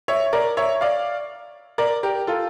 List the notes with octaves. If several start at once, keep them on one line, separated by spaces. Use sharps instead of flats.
C#5 E5
A#4 D5
C#5 E5
D5 F5
A#4 D5
G4 A#4
F4 A4